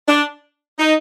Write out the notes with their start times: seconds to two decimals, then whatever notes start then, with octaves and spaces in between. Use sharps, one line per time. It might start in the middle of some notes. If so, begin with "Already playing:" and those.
0.08 D4
0.79 D#4